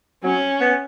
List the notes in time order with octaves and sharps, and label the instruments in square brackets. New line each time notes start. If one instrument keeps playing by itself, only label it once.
[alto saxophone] F#3 [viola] C#4
[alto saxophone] B3